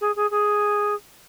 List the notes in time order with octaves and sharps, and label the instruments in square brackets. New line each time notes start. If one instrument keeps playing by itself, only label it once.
[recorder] G#4
G#4
G#4